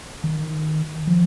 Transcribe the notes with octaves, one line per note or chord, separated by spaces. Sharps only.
D#3
F3